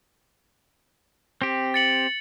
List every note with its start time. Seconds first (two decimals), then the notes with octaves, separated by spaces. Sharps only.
1.42 C4 G4
1.74 A6 C#7 F#7